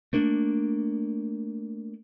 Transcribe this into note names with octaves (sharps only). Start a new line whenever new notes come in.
A3 A#3 D4